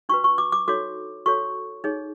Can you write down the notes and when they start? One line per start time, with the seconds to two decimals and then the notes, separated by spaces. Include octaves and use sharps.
0.09 D4 F#4 B4 C#6
0.24 C#6
0.38 D6
0.52 D6
0.68 D#4 F#4 A4 C#5 D6
1.26 F#4 A4 C#5 C#6
1.84 D#4 G#4 C#5